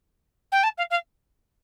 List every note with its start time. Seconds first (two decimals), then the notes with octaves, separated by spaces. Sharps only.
0.52 G5
0.63 A5
0.77 F5
0.90 F5